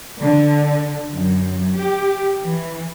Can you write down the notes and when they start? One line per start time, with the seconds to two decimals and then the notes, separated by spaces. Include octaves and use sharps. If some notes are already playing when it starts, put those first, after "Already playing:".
0.21 D3
1.16 F#2
1.79 G4
2.44 E3